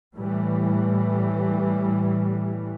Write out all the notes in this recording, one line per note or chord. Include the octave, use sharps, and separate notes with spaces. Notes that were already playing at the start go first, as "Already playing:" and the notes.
A2 E3 G3